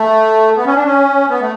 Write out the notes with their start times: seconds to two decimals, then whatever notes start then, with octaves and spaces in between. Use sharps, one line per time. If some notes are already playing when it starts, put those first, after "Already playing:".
Already playing: A3
0.57 B3
0.66 C#4
0.76 D4
0.85 C#4
1.29 B3
1.41 A3